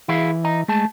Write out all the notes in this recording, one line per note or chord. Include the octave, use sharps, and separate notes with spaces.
E3 E4 G#4 F5
D#5 A#5
G#3 A3 A5